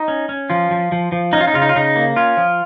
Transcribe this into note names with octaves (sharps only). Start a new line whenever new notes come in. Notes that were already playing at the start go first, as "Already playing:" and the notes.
Already playing: D#4
C#4
C#4
F3 F4
F3
F3
F3
C#4 D#4
F4
D#4
C#3 F4
D#4
F4
C#3 D#4
A#3
C#4 F4
F3